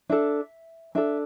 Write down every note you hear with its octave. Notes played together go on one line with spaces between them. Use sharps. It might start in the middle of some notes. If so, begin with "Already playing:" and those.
D4 A4 E5
D4 A4 E5